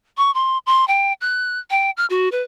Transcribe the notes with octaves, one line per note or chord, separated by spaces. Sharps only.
C#6
C6
C6
G5
F#6
G5
F6
F#4
B4